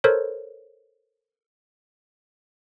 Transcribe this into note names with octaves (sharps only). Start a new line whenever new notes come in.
A4 A#4 C5 C#5